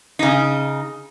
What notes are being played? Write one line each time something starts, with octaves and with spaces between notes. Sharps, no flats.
C#3 D#4